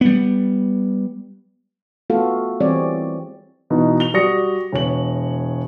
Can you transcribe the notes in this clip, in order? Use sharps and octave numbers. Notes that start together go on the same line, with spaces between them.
G3 B3
A3 B3 F4 F#4 A4 F5
E3 G3 C4 G#4 C#5 D5
B2 E3 B3 D#4
F7 G7
G3 F#4 D5 D#6 A#6 C#7
E1 C#5 F#7